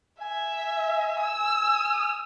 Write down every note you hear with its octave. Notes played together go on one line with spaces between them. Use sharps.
E5 G#5
E6